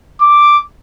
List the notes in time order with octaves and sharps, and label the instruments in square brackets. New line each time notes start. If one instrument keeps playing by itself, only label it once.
[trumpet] D6